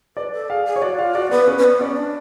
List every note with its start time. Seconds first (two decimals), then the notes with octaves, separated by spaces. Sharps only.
0.16 B4 D5
0.32 A4
0.49 G#4 F5
0.66 G#4
0.76 C#5
0.82 F#4 D5
0.98 F4 F5
1.15 F#4 D5
1.31 B3 B4
1.47 C#4 B4
1.58 C#4
1.64 B3
1.80 C#4 D5
1.97 D4